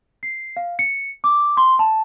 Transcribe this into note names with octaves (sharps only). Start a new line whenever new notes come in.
C7
F5
C#7
D6
C6
A5